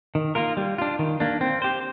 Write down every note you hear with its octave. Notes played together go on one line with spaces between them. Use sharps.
D#3
A#3 F4 A#4
G3
D4 F4
D#3
A#3 D4
C4
G4 C5